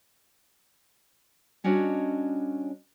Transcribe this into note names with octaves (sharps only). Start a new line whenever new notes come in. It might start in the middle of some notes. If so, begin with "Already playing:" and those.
G3 C#4 D4 F#4 C#5 D#5